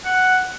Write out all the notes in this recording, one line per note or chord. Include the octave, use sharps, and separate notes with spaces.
F#5